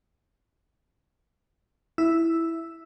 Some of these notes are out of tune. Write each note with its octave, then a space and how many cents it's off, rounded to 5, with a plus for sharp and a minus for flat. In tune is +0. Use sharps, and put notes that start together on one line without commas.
E4 +0 E6 +0